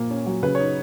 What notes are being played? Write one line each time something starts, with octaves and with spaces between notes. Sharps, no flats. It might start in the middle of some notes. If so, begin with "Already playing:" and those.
Already playing: A#2 F3 A#3
C#4
F#3
C#3 B4
D#4 C#5